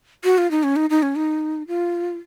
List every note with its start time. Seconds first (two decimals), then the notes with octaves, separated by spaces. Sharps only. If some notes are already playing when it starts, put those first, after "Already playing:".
0.24 F#4
0.38 F4
0.51 D#4
0.63 C#4
0.76 D#4
0.90 D#4
1.03 C#4
1.16 D#4
1.68 F4